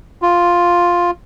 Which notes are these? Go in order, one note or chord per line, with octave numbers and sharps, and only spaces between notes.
F4